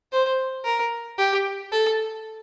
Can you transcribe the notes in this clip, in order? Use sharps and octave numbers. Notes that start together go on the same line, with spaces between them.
C5
A#4
G4
A4